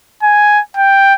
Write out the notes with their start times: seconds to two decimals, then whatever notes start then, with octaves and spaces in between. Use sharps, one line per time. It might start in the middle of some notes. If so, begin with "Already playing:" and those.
0.23 G#5
0.77 G5